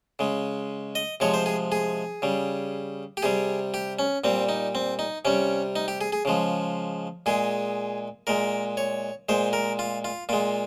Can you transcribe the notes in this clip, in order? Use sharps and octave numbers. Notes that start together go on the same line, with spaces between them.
C#3 G#3
D#5
C3 F3 G#3 C#5
C5
G#4
G#4
C#3 G3
G4
C3 G3 G#4
G4
C#4
A#2 G3 C4
D#4
C4
D#4
C3 G3 C#4
D#4
G4
G#4
G#4
C#3 F3 G#3
A#2 G#3 G#4
A#2 G#3 A#4
C#5
A#2 G#3 C5
A#4
F4
F4
A#2 G#3 F4